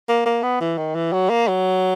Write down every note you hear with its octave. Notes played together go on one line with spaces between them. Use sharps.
A#3
A#3
B3
E3
D#3
E3
F#3
A#3
F#3